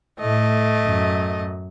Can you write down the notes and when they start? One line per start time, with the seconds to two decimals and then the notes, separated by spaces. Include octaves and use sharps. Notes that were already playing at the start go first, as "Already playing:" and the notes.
0.20 A2 A3 D#5
0.86 F#2